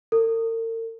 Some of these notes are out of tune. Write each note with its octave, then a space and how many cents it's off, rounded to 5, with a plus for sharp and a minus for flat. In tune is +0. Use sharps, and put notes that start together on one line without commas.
A#4 -45